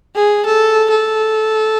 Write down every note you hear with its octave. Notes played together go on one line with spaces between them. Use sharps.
G#4
A4
A4